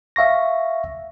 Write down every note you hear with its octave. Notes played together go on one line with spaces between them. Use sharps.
E5 F5 C#6 A#6